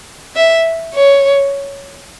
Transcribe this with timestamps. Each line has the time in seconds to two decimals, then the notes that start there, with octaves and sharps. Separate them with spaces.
0.36 E5
0.94 C#5